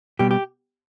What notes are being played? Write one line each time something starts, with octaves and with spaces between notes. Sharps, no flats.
B2 G3 G4
G4